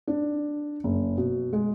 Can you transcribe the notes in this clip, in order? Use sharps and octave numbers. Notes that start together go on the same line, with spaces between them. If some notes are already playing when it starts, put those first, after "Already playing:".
D4
F#1
B2
G#3